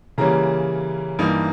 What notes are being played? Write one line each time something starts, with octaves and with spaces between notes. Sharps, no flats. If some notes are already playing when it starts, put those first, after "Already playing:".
C#3 E3 G3 A#3 C#4 A#5
G2 E3 A#3 D#4